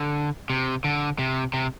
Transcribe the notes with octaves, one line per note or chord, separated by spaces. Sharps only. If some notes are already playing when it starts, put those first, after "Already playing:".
Already playing: D3
C3
D3
C3
C3